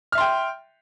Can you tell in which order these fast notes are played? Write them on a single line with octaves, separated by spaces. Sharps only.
F6 E5 C6 G5